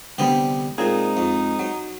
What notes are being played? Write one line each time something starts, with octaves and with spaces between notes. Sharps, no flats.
C2 D3 G3 B3 C4 G4
A#2 G#3 C4 D#4 G#4
F2
F#3